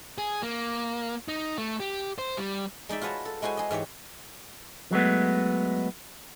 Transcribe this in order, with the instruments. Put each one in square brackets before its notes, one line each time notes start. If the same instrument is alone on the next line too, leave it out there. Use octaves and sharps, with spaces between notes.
[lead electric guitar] G#4
A#3
D#4
A3
G4
C5
G3
[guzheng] G#3 D#4 D5 E5
F4 F#4 B4 C#5 A5 A#5
A4
G#3 E4 F#4 C5 G#5
G#4 D#5
G#2 E3 G4 C#5
[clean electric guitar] F#3 G#3 A3 B3